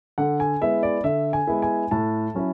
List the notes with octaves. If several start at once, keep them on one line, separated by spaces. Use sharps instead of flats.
D3 F#5
G#5
G#3 B3 E4 E5
D5
D3 E5
G#5
G#3 B3 E4
G#5
A2 A5
F#3 C#4 E4